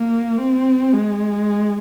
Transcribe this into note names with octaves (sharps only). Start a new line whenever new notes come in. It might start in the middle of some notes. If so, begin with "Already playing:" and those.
Already playing: A#3
C4
G#3